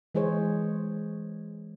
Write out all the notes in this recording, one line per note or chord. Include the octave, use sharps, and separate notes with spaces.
E3 G#3 G#4 C5 C#5